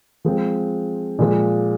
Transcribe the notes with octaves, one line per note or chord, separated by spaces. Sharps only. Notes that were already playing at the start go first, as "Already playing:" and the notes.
F3 G#3 C4
A#2 F3 G#3